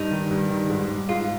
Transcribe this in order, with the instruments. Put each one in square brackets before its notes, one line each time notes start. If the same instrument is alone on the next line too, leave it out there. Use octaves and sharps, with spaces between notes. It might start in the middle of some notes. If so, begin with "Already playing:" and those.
Already playing: [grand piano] G2 [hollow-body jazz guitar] D#4
[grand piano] D#3
G2
D#3
G#2
G3
[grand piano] G#2 [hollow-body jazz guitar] F4